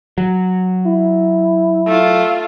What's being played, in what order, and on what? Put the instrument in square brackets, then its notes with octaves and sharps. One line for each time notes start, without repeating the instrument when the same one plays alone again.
[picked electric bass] F#3
[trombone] E4
[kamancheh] A3 F4